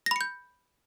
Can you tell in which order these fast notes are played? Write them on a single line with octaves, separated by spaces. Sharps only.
A#6 B5 C#7 G6